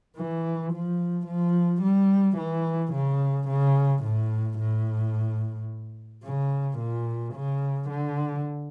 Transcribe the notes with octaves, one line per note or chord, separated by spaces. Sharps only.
E3
F3
F3
G3
E3
C#3
C#3
A2
A2
C#3
A#2
C#3
D3